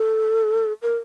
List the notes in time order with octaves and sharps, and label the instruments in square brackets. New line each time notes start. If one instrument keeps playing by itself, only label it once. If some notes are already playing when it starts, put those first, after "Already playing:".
Already playing: [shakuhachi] A4
A#4